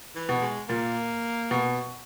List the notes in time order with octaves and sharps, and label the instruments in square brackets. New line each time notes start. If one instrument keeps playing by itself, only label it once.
[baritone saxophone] E3
[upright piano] B2
[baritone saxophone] G#3
[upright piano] A#2 [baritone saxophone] A#3
[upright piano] B2